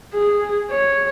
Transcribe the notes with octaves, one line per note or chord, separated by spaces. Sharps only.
G#4
C#5